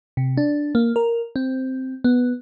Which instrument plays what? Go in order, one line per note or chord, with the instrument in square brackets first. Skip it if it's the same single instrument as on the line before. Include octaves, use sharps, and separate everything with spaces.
[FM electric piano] C3
D4
A#3
A#4
C4
B3